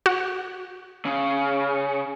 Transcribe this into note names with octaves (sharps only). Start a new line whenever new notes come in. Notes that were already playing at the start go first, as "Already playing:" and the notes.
F#4
C#3